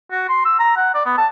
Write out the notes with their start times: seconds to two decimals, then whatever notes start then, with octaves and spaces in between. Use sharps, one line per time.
0.12 F#4
0.29 C6
0.45 E6
0.60 A#5
0.77 F#5
0.94 D5
1.06 B3
1.17 A5